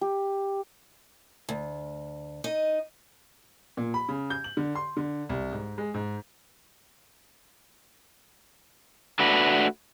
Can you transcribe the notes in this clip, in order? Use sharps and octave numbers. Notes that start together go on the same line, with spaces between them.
G4
D2
D#4 D#5
A#2
B5
C#3
G6
F#7
D3
C6
D3
C2
G#2
G#3
G#2
A3 D4 F#4 B4